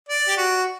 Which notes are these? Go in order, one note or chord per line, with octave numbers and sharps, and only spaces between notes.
D5
G4
F#4